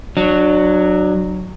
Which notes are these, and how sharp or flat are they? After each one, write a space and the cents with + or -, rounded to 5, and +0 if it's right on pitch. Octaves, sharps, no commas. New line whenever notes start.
F#3 +0 D4 +30